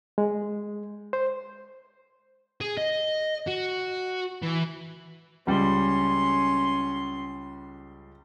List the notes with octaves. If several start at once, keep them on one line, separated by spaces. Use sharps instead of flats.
G#3
C5
G#4
D#5
F#4
E3
C#2 G3 C#4 C6